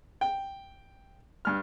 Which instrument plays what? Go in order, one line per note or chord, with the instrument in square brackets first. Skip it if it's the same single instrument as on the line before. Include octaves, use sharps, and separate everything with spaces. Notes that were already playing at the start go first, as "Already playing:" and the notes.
[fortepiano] G5
G2 F6